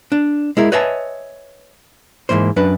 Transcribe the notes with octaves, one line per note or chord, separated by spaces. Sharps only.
D4
G#3 E4 A#4
B4 C#5 D#5 E5 G#5 A5
G#2 B2 E3 A#3 C5
F#2 D4 B4